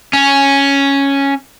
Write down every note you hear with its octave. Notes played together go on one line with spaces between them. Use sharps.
C#4